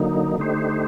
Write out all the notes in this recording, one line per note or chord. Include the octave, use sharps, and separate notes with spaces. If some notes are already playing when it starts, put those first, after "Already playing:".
Already playing: D3 F#3 A#3 D#4
D3 A3 D#4 G4 C5